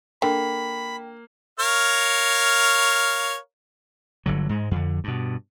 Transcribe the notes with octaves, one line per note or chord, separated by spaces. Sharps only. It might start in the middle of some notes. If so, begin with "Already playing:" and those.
D3 A#3 G5 B5
A#4 C#5 F5
G1 D3 F#3
G#2 G#3
F2 D3
G2 B2